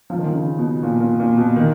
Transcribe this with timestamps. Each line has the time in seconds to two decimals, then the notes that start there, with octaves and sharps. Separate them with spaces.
0.10 F3
0.18 D#3
0.26 F3
0.35 C#3
0.58 B2
0.83 A#2
1.00 A#2
1.20 A#2
1.37 B2
1.56 D#3